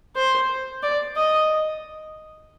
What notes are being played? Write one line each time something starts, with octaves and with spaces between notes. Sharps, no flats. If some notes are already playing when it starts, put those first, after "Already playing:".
C5
D5
D#5